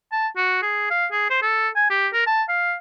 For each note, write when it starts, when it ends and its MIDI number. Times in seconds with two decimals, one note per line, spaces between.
0.12 0.28 81
0.37 0.60 66
0.62 0.87 68
0.91 1.07 77
1.12 1.28 68
1.30 1.40 72
1.42 1.69 69
1.76 1.86 80
1.90 2.08 67
2.13 2.26 70
2.27 2.43 81
2.49 2.75 77